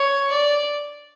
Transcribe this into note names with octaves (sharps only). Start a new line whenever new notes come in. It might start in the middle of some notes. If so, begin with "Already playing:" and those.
Already playing: C#5
D5